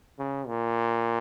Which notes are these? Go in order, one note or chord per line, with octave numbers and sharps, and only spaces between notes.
C#3
A#2